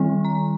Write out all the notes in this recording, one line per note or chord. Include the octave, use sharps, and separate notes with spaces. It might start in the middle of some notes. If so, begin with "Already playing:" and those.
Already playing: D#3 G3 C4
A#5